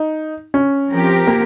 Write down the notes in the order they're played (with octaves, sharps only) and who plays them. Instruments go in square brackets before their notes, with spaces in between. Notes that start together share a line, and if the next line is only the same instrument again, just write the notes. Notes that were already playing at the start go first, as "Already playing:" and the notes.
Already playing: [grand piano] D#4
C#4
[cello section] F3 C4 G4 A#4
[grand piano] A#3